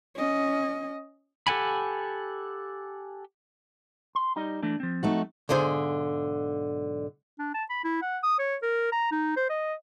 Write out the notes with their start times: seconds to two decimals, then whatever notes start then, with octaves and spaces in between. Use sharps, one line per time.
0.15 C#4 D#5
1.47 G4 A4 F#5 G#5 B5
4.15 C6
4.36 G3 D#4 D#5
4.63 E3 A3 D4
4.80 F3 C4
5.03 A3 D#4 F#4
5.49 B1 G#2 D3 G#4 C5
7.39 D4
7.54 A5
7.70 B5
7.84 E4
8.02 F#5
8.24 D#6
8.39 C#5
8.62 A#4
8.92 A#5
9.12 D#4
9.37 C5
9.50 D#5